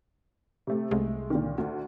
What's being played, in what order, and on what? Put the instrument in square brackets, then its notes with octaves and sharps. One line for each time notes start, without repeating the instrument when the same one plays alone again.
[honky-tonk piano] C3 A3
[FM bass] C2 [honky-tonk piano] G#3 A3
[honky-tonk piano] A#2 D3 D#3
D2